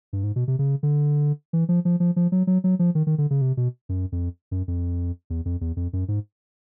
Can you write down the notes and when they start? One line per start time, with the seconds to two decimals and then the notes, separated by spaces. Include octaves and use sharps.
0.13 G2
0.24 G#2
0.36 B2
0.48 C3
0.59 C#3
0.83 D3
1.53 E3
1.69 F3
1.85 F3
2.00 F3
2.16 F3
2.32 F#3
2.47 F#3
2.64 F#3
2.79 F3
2.95 D#3
3.07 D#3
3.18 D3
3.30 C#3
3.41 C3
3.57 B2
3.89 F#2
4.12 F2
4.51 F#2
4.68 F2
5.30 E2
5.45 F2
5.61 E2
5.77 F2
5.93 F#2
6.08 G#2